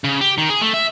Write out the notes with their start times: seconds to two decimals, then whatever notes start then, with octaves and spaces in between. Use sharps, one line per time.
0.04 C#3
0.21 G4
0.38 D#3
0.50 G#4
0.61 A3
0.74 E5